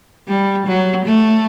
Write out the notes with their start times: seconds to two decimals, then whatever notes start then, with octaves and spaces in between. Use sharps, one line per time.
0.28 G3
0.67 F#3
1.06 A3